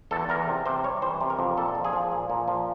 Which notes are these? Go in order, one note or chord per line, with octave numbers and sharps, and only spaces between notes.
E2 A4
E2 A#4
C3
C3 C5
G3 C#5
E3 C5
C3
A#4
F2
A#2 A4
F3
G#4
F3
A#2
A#2
F3